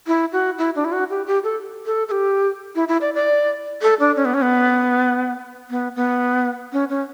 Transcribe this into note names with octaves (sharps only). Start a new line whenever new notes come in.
E4
F#4
E4
D4
E4
F#4
G4
G4
A4
A4
A4
G4
E4
E4
D5
D5
A4
D4
C#4
B3
C#4
B3
B3
B3
C#4
C#4